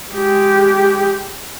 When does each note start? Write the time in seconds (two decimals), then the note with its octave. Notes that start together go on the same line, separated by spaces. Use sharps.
0.11 G#3 G4